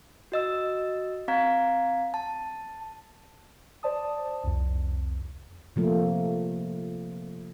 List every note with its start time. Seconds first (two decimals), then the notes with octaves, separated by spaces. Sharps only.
0.32 F#4 D#5 E6
1.28 C4 F5 A#5 G#6
2.14 A5
3.83 C5 D5 A5 D#6
4.44 C2 F2
5.76 C3 F3 A3 A#3